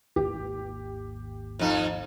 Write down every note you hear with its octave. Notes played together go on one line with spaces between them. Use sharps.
G#1 D#2 G4
F2 D#4